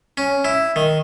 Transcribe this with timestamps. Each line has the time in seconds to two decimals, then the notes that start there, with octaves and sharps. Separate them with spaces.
0.17 C#4
0.45 E4
0.76 D#3